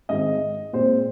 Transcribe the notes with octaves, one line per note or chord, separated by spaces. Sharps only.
G#2 D#3 G#3 C4 D#5
A#2 G#3 C4 C5